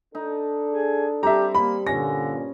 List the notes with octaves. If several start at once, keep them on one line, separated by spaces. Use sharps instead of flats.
D4 D#4 A4
G#4
G3 C4 G4 E5 A5 A#5
A#3 B5
G2 A#2 D3 C#4 A#6